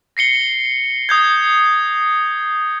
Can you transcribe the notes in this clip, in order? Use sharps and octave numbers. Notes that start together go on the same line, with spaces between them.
A#6 C7 C#7 G7
D#6 G6 G#6